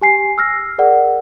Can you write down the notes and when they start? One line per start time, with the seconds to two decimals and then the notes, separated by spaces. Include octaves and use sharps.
0.01 G4 G#5 C7
0.38 E6 F6 A#6
0.78 G#4 A#4 D5 F#5